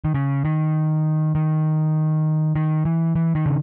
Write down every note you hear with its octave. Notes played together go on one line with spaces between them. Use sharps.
D#3
C#3
D#3
D#3
D#3
E3
E3
D#3
C#3